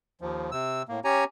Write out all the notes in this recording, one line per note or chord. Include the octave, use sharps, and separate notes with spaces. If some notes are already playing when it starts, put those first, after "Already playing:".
D#2 F3
C3 E6
A2 A#3
C#4 G4 C#5 G#5 A#5